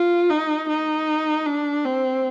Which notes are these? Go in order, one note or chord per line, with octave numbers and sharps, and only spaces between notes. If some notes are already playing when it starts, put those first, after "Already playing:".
Already playing: F4
D#4
D#4
D4
C4